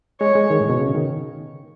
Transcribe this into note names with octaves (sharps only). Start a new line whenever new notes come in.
G#3 C#5
G#3
D#3
A2
B2
C#3
D#3